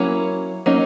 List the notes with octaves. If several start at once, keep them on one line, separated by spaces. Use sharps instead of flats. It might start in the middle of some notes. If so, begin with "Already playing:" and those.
Already playing: F#3 A#3 C#4 E4
F#3 A#3 C#4 D#4